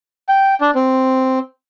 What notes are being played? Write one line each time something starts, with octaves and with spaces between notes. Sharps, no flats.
G5
D4
C4